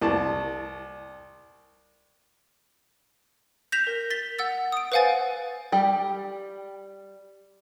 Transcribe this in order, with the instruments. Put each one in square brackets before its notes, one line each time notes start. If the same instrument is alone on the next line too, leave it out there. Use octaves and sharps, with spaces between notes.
[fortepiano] C2 A5
[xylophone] G6 A#6 B6 E7 F7
A#4
A6 B6 G7
F#5 E6 A6
D#6 D7
B4 C5 F5 F#5 G#5 A6
[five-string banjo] G3 G4